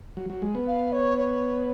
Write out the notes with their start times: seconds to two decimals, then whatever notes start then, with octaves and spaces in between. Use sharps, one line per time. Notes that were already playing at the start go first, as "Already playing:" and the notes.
0.17 F#3
0.30 F#3
0.42 G#3
0.55 B3
0.67 F5
0.92 C#5
1.18 C#5